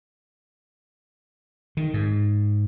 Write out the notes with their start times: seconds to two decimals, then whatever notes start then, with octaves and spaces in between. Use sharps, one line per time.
1.77 D#3
1.94 G#2